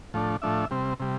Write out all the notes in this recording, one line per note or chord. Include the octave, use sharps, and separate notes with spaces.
A2 F3 A3 D4
A2 F3 A3 D4 E5
C3 G3 C4
C3 G3